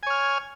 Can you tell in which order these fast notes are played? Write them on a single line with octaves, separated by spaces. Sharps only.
G#5 C#5 F6